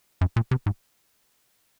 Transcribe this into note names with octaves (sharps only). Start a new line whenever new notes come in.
F#2
A#2
C3
G#2